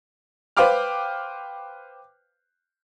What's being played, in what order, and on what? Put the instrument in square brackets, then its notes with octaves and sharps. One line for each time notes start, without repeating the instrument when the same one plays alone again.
[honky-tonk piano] B4 C5 F5 G5 D6 F6